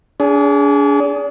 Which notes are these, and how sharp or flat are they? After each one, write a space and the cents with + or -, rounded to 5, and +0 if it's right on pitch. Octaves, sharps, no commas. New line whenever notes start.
D4 -40 G#4 +0